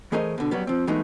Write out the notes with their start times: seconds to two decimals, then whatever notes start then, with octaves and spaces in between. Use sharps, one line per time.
0.12 E3 A3 G#4 A#4 C5 D#5
0.38 B2 D3
0.51 F#2 F#3 G3 B3
0.67 F3 C4
0.87 E3 G#3 A3 B3 D#4 F#4